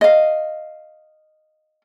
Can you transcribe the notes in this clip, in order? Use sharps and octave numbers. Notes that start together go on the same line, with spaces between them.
D#5 F5